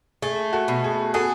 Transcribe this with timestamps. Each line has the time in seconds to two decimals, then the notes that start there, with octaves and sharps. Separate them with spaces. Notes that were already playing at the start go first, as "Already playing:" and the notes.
0.22 A3 G#4
0.53 F#4 A4
0.68 B2
0.84 G#4
1.14 F#4 G#4 A4